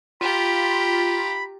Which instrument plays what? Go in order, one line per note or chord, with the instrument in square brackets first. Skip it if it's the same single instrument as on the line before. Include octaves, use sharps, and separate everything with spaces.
[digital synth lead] F4 [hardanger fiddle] G4 A#5 [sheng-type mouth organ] B5